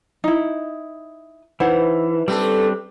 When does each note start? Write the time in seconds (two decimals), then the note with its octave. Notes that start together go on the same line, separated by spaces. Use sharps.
0.24 D#4 E4
1.60 E3 D#4 B4 C5 F#5
2.28 G3 A3 C4 D4 A4